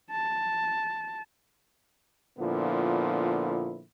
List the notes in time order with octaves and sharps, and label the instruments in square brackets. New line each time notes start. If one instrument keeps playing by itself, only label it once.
[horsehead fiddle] A5
[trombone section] A#2 D3 F3 B3 E4